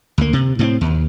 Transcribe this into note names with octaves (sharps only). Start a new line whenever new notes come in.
D2 A#3
C3
A2 A3 C4
D#2